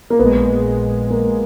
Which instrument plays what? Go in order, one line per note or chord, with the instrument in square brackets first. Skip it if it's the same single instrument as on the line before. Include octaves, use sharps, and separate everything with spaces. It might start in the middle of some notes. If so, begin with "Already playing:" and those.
[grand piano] A#3
[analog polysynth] A#1 A#2 G#3 [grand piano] B3
[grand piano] A#3